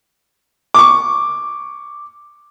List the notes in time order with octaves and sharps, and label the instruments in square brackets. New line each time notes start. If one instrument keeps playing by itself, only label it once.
[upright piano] C#6 D6